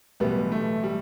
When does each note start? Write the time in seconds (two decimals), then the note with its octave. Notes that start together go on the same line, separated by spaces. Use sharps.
0.20 B1 A2 E3 G3 B3
0.52 A3
0.83 G3